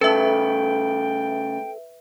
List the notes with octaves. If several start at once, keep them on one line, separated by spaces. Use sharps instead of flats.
C#3 A3 A4 B4 E5 G5